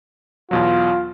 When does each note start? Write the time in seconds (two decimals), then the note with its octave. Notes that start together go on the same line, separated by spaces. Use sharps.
0.51 E2 B2 F#3 F4